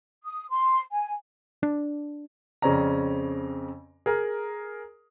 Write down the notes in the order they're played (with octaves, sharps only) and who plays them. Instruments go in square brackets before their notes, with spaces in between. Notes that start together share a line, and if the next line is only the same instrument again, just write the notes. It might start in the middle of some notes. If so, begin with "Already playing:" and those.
[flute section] D#6
C6
G#5
[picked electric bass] D4
[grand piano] F2 C#3 C4 C#4 D5 A#5
G#4 A#4